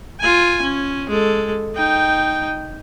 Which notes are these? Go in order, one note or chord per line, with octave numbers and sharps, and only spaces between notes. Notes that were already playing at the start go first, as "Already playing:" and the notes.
F4 G#5
C#4
G#3 A4
D#4 G5